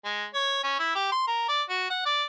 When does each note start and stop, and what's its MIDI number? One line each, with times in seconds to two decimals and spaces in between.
0.05 0.26 56
0.34 0.61 73
0.64 0.78 61
0.80 0.91 64
0.95 1.08 67
1.12 1.27 84
1.28 1.48 70
1.49 1.63 74
1.70 1.90 66
1.90 2.03 78
2.06 2.24 74